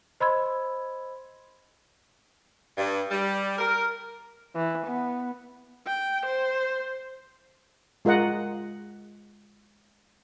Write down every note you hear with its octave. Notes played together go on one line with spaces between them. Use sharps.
C5 D#5 B5 C6 E6 G#6
G2
G3
A#4
E3
B3
G5
C5
G#3 F4 A#4 D#5 F#5